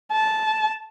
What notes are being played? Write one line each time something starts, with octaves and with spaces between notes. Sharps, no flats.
A5